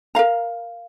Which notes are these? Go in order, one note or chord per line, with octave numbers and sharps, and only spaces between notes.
A#4 F5 A#5